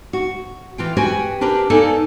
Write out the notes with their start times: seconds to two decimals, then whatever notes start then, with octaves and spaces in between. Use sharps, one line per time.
0.13 F#4
0.78 E3 F4 G5
0.97 F#4 G4 B4 G5 G#5
1.41 D4 G4 A#4 B4
1.70 A#3 B3 D#4 A4 D5 G#5